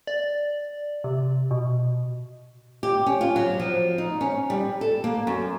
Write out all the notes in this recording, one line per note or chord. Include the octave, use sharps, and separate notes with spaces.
D5
C3
B2
G4
C#4
F4
F#3
F3
D#4
C#4
G3
A4
A#3
F#2